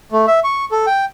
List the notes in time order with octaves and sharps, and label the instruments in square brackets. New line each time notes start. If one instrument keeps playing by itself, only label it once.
[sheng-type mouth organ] A3
E5
C#6
A4
G5